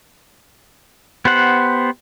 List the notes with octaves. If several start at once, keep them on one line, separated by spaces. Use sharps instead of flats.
B3 G4 C5 F#5